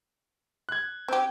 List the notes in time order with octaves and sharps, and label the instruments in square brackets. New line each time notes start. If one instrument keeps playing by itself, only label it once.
[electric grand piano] F#6 G#6
[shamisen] C4 G4